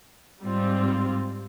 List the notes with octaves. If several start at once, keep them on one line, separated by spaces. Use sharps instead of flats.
G#2 G3 C4 F4